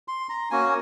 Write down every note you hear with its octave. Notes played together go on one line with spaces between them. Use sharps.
C6
A#5
A#3 C#4 F#4 G#5